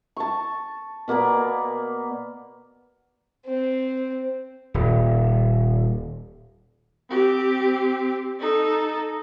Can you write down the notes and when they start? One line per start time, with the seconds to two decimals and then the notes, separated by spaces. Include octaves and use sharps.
0.16 A5 C#6
1.08 B2 A#3 B3 D5
3.45 C4
4.74 D#1
7.10 C4 G4
8.40 D#4 A4